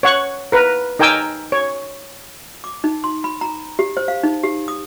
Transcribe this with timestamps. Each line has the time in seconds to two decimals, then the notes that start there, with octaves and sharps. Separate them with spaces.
0.03 C#5 F#5 C#6
0.52 A#4 B4
0.99 D#4 A#4 G5 G#5 D6 E6
1.52 C#5
2.64 D6
2.84 D#4
3.04 C6
3.24 B5
3.41 A#5
3.79 G4
3.97 C5
4.08 F5
4.23 D#4
4.43 G4
4.68 D#6